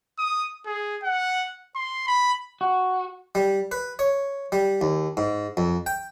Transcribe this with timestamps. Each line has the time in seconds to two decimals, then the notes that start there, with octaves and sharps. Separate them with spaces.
0.18 D#6
0.66 G#4
1.03 F#5
1.76 C6
2.08 B5
2.61 F#4
3.35 G3
3.72 B4
3.99 C#5
4.52 G3
4.81 D#2
5.17 G#2
5.57 F2
5.86 G5